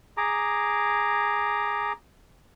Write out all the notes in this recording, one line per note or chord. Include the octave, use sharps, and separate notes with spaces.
G#4 A#5 D6